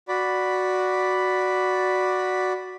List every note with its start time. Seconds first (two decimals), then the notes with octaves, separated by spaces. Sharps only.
0.08 F#4 D5 B5